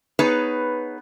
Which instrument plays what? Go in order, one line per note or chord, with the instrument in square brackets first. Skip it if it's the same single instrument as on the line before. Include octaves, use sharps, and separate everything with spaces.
[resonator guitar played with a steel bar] B3 D#4 G#4 B4 C#5